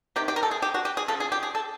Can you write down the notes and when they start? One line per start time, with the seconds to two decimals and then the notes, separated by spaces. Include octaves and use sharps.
0.16 C3 D#3 G4
0.28 G4
0.36 A#4
0.43 A4
0.51 G#4
0.62 G4
0.74 F#4
0.85 G4
0.97 G#4
1.08 C#3 F3 A4
1.20 G#4
1.32 G4
1.43 G#4
1.55 A4